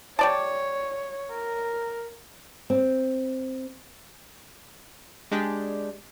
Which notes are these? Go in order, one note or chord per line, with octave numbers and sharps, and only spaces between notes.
G3 C#5 D5 A5
A#4
C4
G#3 D4 G4